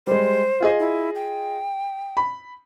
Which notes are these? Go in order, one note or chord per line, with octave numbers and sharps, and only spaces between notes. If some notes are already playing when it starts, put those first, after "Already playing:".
G3 G#3 C5
F4 G#4 D#5
E4
G5
B5